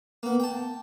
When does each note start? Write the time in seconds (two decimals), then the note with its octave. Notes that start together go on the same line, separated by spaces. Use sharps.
0.23 A#3 B3
0.40 G5 A5